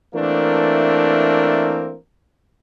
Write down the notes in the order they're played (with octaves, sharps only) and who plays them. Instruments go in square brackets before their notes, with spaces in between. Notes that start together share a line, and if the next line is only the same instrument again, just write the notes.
[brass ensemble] E3 A3 A#3 C4 D4 A#4